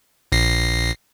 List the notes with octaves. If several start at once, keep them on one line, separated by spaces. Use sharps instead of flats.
A#1 A#6 C7